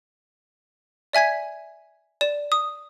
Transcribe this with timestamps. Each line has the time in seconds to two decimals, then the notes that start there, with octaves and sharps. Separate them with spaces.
1.13 D5 E5 G#5 G#6 B6
2.21 D5 E7
2.52 D#6